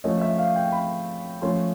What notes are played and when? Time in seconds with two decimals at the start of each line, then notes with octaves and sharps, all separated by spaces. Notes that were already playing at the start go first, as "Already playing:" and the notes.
0.04 F3 A3 C#4 D#5
0.21 E5
0.38 F5
0.56 G5
0.72 B5
1.42 F3 A3 C#4 C6